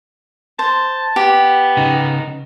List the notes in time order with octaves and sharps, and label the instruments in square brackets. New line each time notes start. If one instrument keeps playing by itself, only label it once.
[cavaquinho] C5 [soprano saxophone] A5
[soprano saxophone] B3 [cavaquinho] G4
[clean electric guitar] C#3 D#4